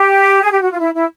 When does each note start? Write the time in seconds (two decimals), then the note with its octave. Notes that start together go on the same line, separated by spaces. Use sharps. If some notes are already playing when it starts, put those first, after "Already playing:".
Already playing: G4
0.43 G#4
0.52 G4
0.62 F#4
0.71 F4
0.80 E4
0.95 E4